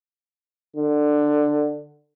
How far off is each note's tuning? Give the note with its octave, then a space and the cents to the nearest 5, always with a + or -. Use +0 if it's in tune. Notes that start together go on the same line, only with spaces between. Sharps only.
D3 +15